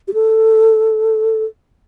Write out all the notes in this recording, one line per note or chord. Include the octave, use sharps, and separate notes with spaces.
G4
A4